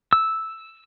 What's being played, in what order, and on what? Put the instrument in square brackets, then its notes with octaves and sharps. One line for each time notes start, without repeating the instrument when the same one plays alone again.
[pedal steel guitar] E6